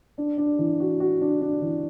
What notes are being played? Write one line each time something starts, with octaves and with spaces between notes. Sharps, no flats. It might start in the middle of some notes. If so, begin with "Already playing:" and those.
D4
D4
E3
F#4
F#4
D4
D4
E3